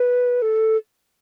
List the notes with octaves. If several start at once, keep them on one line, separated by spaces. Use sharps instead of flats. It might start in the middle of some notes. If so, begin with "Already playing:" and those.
Already playing: B4
A4